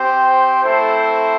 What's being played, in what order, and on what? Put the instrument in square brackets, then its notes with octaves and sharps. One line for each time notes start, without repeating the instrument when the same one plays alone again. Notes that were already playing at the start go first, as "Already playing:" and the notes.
Already playing: [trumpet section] C4 G4 C5 G5
A3 C4 E4 A4 C5